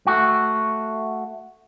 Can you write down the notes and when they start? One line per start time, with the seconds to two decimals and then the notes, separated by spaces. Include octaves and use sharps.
0.07 A3 F#4